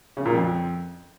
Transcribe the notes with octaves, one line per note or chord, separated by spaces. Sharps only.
C#3
A#2
F2